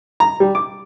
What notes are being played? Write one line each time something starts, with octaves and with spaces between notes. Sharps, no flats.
A#5
G3
D6